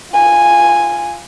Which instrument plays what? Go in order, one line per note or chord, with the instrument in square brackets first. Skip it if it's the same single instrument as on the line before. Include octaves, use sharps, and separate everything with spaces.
[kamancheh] F4 G#5